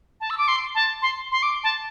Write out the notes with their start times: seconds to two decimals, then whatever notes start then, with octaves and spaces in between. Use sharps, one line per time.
0.21 A5
0.30 E6
0.38 D6
0.48 C6
0.75 A5
1.02 C6
1.32 C6
1.43 D6
1.64 A5